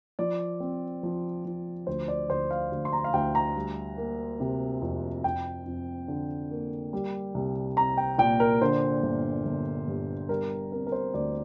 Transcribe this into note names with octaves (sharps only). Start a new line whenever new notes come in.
F3 D5
C4
F3
F3
D2 C5
D5
D2 C5
F5
D2
C6
A#5
F5
D2 G5
A#5
G3
A#3
C3
F2
F2 G5
F2
D3
A#3
G3
C2
C4 A#5
G5
A#2 G5
A#4
D3 C5
G1
G1
G2
G3 A#4
C4 A#4
A#4
C5
D2 D5